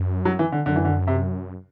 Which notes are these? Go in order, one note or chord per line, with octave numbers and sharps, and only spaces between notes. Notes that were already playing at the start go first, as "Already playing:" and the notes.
Already playing: F#2
F#3
E3
D3
F#2 D3
E3
D3
C3